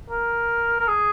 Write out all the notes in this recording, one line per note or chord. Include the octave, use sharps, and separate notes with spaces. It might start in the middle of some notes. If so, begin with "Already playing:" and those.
A#4
A#4
G#4